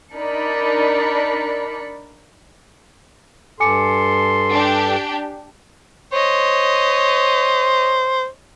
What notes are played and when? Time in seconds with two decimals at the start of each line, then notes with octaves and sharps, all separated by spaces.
0.14 D4 D#4 A#4 D5 B5 C#7
3.60 G2 A4 G#5 C6 D6 C#7
4.51 D4 G4
6.12 C5 C#5 D#5